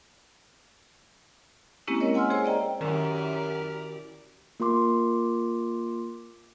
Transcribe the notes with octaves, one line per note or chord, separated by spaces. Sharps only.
G#3 A#3 C4 C#4 E4 G4
A#4 C#5 D#5
F#5 G#5 C6 E6 F6
G#4 C5 C#5 G#5
D5 D#5 G5 A#5
F#2 D#3 E4 G4 A#4 D5
A#3 F4 A#4 C6 D6